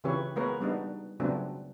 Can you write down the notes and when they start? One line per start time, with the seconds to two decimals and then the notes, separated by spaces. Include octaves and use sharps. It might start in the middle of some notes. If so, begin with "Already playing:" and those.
0.04 C#3 E3 C4 G4 B4 C#5
0.36 G#3 A#3 B3 A#4 B4 C#5
0.60 G3 B3 D4 D#4
1.20 C#3 F#3 A3 B3 C4 D4